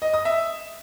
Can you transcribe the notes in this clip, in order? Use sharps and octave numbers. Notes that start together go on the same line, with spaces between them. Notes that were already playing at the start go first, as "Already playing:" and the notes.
D#5
D#6
E5